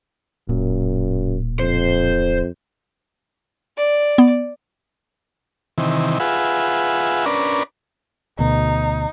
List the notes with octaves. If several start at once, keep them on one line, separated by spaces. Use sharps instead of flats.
D1 F#2 A#2
F2 C5
D5
B3
C3 D#3 E3
F4 G#4 B4 E5 F#5
C#4 D4 A#4 B4 D5
D2 B2 D#4